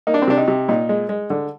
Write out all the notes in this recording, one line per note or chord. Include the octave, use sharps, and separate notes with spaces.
A#3 D#4
D4
C4
C3 D4
D#4
C3
A#2 D#4
G#3
G#3
D3